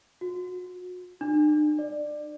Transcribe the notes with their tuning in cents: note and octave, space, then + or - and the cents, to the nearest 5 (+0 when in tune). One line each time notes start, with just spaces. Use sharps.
F#4 -35
D4 +45
D5 +20